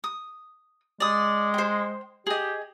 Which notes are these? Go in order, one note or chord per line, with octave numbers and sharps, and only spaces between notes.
D#6
G#3 D5 D#6
C5 G5
G4 G#4 D#5